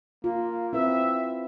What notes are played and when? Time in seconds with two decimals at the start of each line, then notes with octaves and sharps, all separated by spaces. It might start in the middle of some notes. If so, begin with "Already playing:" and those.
0.24 A#3 F4
0.73 C4 E4 B4 E5